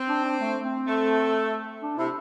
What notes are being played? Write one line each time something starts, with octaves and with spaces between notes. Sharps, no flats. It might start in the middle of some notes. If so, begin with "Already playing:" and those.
Already playing: C4
D4
D4
A3
C4
A3
D4
C3 E4